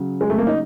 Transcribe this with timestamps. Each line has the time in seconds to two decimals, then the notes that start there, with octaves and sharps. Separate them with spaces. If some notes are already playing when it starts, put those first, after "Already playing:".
Already playing: C#3 F#3
0.21 G#3
0.30 A3
0.38 A#3
0.47 D#4